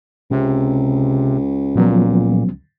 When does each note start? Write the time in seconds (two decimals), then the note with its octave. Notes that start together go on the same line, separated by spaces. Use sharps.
0.31 C#2 C3
1.76 A#2 F3 F#3 B3